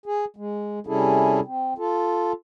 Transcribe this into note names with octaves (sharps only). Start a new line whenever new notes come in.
G#4
G#3
C3 G3 C#4 E4 G#4 A4
C4
F4 A4